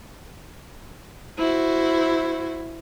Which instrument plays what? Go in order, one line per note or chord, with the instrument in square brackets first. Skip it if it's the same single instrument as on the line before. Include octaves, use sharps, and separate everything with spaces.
[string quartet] E4 F#4 C5